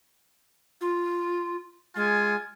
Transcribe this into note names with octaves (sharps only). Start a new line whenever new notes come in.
F4
G#3 F4 G#5